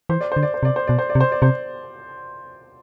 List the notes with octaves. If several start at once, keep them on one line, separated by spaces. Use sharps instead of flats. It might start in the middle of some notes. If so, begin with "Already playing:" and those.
E3 C5
D5
D3 C5
D5
C5
C3 D5
C5
B2 D5
C5
D5
C3
C5
D5
C3 C5